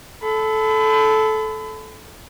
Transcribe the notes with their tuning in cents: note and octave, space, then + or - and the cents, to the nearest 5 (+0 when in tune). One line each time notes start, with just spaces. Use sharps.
A4 -15 B5 +35